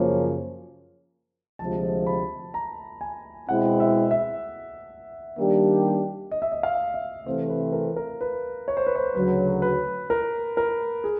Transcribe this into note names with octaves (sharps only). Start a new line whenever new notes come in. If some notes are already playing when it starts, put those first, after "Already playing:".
Already playing: F#2 C#3 F3 A#3 C#4
D2 C3 F3 G#3 A5
B5
A#5
G#5
B2 G#3 C4 E4 F#5
E5
E5
D#3 G3 A#3 D4 G4
D#5
E5
D#5
F5
E5
C3 E3 A3 C4 C5
B4
A#4
A#4
B4
C#5
C5
B4
C5
D2 C#3 F#3 B4
B4
A#4
A#4
G#4